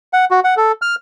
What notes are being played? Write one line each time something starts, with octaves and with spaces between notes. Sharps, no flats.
F#5
F#4
F#5
A4
F6